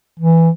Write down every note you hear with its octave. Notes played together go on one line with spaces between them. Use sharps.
E3